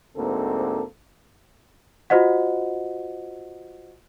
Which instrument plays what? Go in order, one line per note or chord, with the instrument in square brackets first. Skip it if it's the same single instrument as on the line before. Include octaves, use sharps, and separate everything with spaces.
[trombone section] D2 G#2 A#3 C4 A4
[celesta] F4 F#4 C5 D#5 F#5